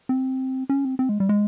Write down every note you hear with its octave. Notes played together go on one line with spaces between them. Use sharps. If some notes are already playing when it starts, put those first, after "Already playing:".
C4
C#4
C4
C4
G#3
G3
G#3